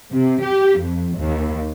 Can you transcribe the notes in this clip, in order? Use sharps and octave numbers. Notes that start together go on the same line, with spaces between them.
C3
G4
F2
D#2